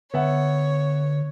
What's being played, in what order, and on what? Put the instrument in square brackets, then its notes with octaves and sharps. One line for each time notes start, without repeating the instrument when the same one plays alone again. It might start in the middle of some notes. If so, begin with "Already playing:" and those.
[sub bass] D3 [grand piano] B3 E5 F#5 [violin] C#5